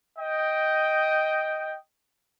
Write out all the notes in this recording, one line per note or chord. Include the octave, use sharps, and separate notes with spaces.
D#5 G5